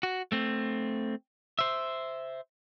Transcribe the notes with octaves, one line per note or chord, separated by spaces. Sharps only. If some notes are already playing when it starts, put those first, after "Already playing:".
F#4
A3 C4
C5 E5